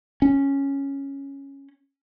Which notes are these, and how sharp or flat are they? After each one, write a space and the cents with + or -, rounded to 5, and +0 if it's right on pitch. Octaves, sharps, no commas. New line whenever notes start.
C#4 -5